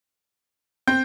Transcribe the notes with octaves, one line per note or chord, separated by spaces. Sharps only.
C4 G6